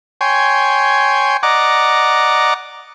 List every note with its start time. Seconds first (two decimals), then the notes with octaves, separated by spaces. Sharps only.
0.21 C#5 G5 G#5 C6
1.43 D5 D#5 F#5 A#5 D6